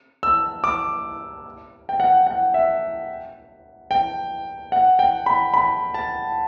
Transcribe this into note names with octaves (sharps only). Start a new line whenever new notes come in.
E6
D6
G5
F#5
F#5
E5
G5
F#5
G5
B5
B5
A5